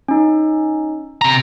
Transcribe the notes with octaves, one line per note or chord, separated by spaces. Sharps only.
C#4 D#4
C3 A#5